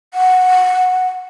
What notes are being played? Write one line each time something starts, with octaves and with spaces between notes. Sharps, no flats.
F#5